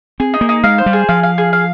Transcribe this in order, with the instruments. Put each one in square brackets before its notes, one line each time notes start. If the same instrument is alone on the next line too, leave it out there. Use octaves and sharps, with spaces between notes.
[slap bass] C4 [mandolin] G#4
[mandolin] D#4
[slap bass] A#3
[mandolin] D#4
[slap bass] G#3 [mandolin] F5
[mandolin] C5
[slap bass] G3
[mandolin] G#4
[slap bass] F3 [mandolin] F5
[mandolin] F5
G#4
F5